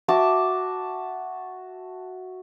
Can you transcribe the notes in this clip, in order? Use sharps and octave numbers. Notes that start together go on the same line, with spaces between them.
F#4 E5 A5 D6